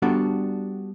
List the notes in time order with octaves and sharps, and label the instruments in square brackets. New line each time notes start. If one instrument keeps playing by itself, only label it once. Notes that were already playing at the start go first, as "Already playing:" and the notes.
[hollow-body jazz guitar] G3 B3 D4 F#4 G4 A4